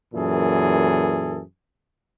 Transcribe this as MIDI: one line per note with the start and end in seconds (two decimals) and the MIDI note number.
0.14 1.40 42
0.14 1.40 46
0.14 1.40 52
0.14 1.40 68
0.14 1.40 69